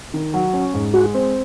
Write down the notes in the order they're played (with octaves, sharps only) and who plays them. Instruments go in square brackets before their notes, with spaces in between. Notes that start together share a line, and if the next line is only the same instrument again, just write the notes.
[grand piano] D#3
F#3
C#4
G#2
[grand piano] G#3 [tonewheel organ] F#4
[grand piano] C4